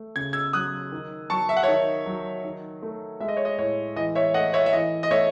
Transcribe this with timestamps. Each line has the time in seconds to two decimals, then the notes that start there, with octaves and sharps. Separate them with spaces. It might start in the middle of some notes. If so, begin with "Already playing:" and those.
Already playing: A3
0.16 C#3 G#6
0.33 E6 G#6
0.53 F#3 D#6 F#6
0.92 D#3
1.30 F#3 A5 C#6
1.49 E5
1.57 F#5
1.63 D#3 C#5 E5
2.06 F#3
2.44 D#3
2.82 A3
3.20 G#3 E5
3.28 D#5
3.37 C#5
3.45 D#5
3.58 A2 C#5
3.96 E3 D#5
4.15 C#5 E5
4.34 A3 D#5 F#5
4.54 C#5 E5
4.66 E5
4.73 E3 D#5
5.03 D#5
5.11 A3 C#5 E5